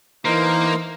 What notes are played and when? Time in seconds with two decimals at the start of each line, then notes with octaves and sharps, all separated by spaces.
0.25 E3 A#3 D#4 A#4 C5